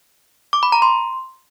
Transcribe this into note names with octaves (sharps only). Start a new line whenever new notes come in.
D6
B5
A#5
C6